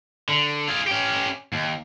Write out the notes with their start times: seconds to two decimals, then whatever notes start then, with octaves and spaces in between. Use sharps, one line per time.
0.29 D3
0.68 F4 G#4
0.87 C#4 G4
1.53 D#2